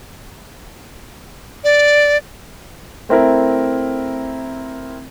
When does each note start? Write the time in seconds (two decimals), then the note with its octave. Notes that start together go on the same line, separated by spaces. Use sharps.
1.64 D5
3.09 A3 C4 E4 A#4